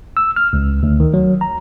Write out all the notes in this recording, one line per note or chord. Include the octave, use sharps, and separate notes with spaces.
E6
F6
C#2
D2
D#3
F#3
A#5